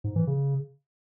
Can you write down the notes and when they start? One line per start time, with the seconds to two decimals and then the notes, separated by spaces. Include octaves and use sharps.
0.04 G#2
0.16 E3
0.27 C#3